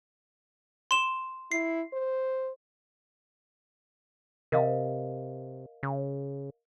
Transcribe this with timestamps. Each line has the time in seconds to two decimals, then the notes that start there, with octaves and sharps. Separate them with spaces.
0.91 C6 E7
1.52 E4 C7
1.93 C5
4.52 C3 A#4 D#5 F5
5.83 C#3